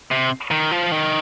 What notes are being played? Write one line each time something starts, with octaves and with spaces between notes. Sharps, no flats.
C3
D#3
F3
D#3